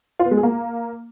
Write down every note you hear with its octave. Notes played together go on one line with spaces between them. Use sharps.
F4
B3
G#3
G#4
A#3